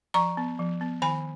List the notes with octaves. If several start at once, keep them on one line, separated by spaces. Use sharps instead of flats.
F3 A#5 C#6
B3
F3
B3
D#3 G#5 B5